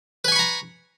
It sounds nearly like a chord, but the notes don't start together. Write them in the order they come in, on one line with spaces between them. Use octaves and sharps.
B4 G#5 C#6 B5 A#5